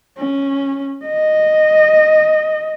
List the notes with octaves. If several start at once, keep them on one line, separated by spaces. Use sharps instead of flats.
C#4
D#5